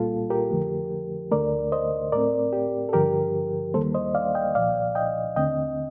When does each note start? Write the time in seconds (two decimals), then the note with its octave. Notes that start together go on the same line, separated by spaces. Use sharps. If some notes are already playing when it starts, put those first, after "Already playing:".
Already playing: C2 A#2 G3 A#3 F4 A4
0.30 G4 A#4
0.51 F2 D3 F3 A3
1.31 D2 D3 A3 A#4 D5
1.72 C5 D#5
2.12 A2 A3 C4 A#4 D5
2.53 G4
2.89 A4
2.93 G2 D3 F3 G4 A#4
3.74 D#2 D#3 G3 A#3 A4 C5
3.95 C5 D#5
4.15 D5 F5
4.35 D#5 G5
4.55 C2 A#2 F3 D5 F5
4.95 D#5 G5
5.36 D#2 D3 A3 C4 D#5 G5